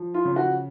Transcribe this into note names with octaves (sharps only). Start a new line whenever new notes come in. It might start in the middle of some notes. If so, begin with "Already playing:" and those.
Already playing: F3
F4
C#3
F#4